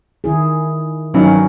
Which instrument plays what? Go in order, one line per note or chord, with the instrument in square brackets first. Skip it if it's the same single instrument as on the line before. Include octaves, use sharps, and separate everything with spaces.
[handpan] D#3 E4 G#4
[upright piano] G2 D#3 E3 [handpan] F#3 C#4 D#4